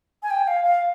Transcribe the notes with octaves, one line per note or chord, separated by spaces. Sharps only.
G#5
G5
F5
F5